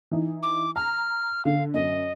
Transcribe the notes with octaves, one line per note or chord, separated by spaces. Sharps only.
E3 D#4
D6
A#5 F6
D3 F5
F#2 D#5